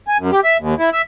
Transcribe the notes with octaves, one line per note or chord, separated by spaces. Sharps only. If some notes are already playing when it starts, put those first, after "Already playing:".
G#5
F#2
G4
E5
D#2
E4
E5